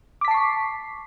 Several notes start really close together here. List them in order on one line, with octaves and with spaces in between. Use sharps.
D6 B6 A5 C7 C#6